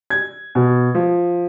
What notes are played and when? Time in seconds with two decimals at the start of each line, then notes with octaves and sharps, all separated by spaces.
0.10 G#6
0.55 B2
0.95 F3